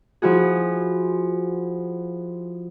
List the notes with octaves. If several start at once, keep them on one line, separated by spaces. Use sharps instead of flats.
F3 E4 F#4 G#4